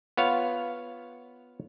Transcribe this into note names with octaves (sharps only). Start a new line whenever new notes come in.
B3 F4 C#5 F5